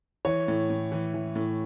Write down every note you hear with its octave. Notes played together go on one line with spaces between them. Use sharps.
E3 C#5
A2
A2
E3
E3
A2